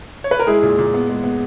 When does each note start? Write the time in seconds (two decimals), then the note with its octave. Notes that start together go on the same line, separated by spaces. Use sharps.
0.24 C#5
0.31 B4
0.40 A#4
0.47 G#3 E4 G#4
0.63 A#2
0.79 A#2
0.94 B3
1.09 G#3
1.24 B3